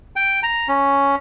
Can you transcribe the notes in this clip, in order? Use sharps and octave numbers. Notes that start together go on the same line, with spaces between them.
G5
A#5
C#4